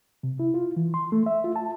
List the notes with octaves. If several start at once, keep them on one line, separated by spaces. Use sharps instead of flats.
C3
E4
F4
E3
C6
A3
E5
F4
A5